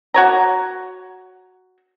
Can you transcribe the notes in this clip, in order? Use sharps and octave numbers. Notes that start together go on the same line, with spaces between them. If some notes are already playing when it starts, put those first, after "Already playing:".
F#4 C#5 A#5